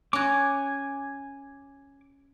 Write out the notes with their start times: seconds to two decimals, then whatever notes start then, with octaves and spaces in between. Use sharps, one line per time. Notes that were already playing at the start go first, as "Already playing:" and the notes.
0.13 C#4 F#4 G#5 D6